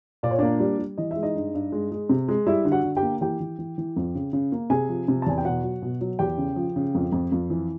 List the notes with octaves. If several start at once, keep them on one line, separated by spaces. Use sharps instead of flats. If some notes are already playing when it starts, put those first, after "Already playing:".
A#2 D5
C#5
A#3 D4 D5
G3
G3
E3 D#5
G#3 E5
D#4 D#5
G2
G2
G#3
G#3
C3
G#3
G3 E4 E5
D3
F#4 F#5
D3
G4 G5
A#3
E3 G4 G5
E3
E3
E3
F2
C#3
C#3
A#3
C3 G#4 G#5
F3
C3
A5
E2 G#5
G5
B2 F#4 F#5
F#3
B2
F#3
E2 G4 G5
C#3
F3
C#3
F2
F2
F2
E3